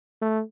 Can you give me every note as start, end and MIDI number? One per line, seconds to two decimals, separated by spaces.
0.22 0.42 57